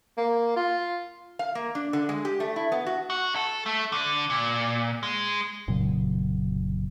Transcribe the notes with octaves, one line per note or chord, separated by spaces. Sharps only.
A#3
F4
F5
A#3
D4
D3
G#3
G4
A3
E4
B3
F#4
F#4
A4
A3
D3
A#2
G#3
F1 A#2 C#3 F#3